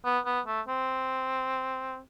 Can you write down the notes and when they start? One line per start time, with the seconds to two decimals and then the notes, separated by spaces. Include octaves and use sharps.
0.05 B3
0.26 B3
0.46 A3
0.68 C4